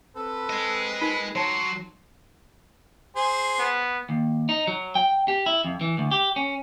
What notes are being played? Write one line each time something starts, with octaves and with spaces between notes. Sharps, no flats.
C4 A4 B4
G#4 D#5
D#4 F4 A#4 B5
F#3 C#5 A5 C6
G#4 C5
B3
D#2
D#4
F#3
G5
G4
E4
F2
E3
D2
G4
C#4